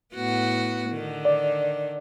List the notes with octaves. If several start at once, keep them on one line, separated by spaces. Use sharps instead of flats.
A2 B3 F#4
D3 D#3
D5